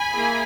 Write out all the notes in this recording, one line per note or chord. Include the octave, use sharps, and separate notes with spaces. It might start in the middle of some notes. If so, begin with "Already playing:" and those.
Already playing: G#5 B5
A#3 E4 G#4